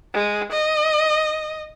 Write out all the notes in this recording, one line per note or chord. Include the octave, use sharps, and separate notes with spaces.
G#3
D#5